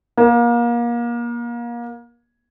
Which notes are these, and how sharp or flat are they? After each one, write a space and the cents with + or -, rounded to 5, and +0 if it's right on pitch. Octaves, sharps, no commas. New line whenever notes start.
A#3 +30